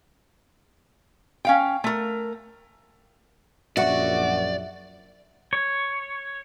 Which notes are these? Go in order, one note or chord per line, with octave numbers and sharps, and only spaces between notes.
C#4 F5 G5
A3 A#4
A#1 F#2 F#4 D5 E5 F#5 C#6
C#5